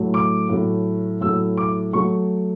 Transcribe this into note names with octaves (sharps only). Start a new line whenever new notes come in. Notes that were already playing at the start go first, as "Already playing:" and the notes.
Already playing: A2 F#3 A3
D6
A2 F#3 A3
A2 F#3 A3 E6
D6
F#3 A3 C#6